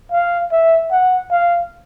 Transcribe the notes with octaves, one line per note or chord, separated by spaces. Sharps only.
F5
E5
F#5
F5